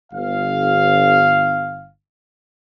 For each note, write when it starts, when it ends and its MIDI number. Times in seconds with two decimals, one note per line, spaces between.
0.13 1.89 31
0.13 1.89 77